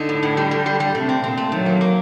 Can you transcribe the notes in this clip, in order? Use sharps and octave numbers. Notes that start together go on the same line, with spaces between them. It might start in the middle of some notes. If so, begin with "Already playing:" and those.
Already playing: D3 D#4
A2
A2
G3
G3
G3
G3
C3 A3
C4
A#2 C4
A3
D#3 F#3
A#3
A#3